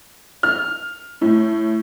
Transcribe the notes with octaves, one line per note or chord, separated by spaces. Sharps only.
F6
A2